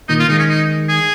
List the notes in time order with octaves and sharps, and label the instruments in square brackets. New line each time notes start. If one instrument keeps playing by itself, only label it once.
[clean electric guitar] A#2 D#3 [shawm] D#4
[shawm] F4
[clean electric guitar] D#3 G#3 [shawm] D#4
[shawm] C#4
D#4
G#4